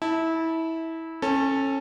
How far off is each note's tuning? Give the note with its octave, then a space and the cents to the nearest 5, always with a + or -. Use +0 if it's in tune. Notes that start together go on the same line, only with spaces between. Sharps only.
E4 -20 A5 +0
C#4 -25 A4 +0